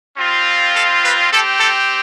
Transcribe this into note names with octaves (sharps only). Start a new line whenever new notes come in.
G3 C4 F4
A4
B4
C4 G4 A4
A4